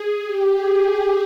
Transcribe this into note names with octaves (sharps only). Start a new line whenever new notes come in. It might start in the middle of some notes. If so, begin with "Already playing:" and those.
Already playing: G#4
G4
G#4
G#4